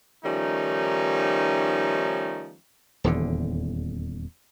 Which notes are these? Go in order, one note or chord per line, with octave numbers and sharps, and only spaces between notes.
D#3 F3 G3 A3 C#4 D#4
D#1 E2 D3